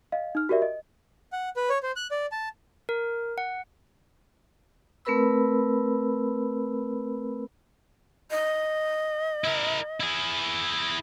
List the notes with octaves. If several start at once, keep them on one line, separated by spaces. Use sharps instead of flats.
D#5 F5
D#4 F6
F#4 G4 A#4 D5 E5
D#5
F#5
B4
C#5
C5
F#6
D5
A5
A#4
F#5
A3 C4 A#4 B4 B5 E6
D#5
E4 A#4
E4 G#4